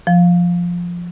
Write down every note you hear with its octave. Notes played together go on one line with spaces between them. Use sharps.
F3